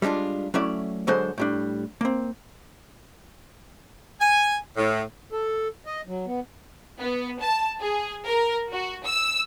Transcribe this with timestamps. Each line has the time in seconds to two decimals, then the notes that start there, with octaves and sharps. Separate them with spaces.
0.02 G3 G#3 C4 D4 F4
0.54 F#3 A3 C#4 E4 D5
1.07 D3 F#3 G#3 A4 C5
1.38 A2 G3 D4
2.01 A#3 C4
4.20 G#5
4.77 A2
5.32 A4
5.86 D#5
6.07 F#3
6.27 B3
7.00 B3
7.41 A5
7.80 G#4
8.27 A#4
8.72 F#4
9.04 E6